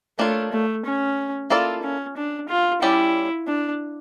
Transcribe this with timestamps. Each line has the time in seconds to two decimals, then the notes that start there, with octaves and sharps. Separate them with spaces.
0.19 A3 A#3 D4 F4 C#5
0.52 A3
0.85 C#4
1.50 A#3 E4 F4 A4 D5
1.83 C#4
2.16 D4
2.49 F4
2.81 G3 C#4 E4 G4 D5
3.47 D4